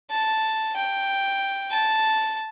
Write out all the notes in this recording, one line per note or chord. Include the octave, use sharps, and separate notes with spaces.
A5
G5
A5